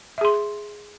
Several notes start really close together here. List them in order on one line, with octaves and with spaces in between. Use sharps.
E5 G#4 C6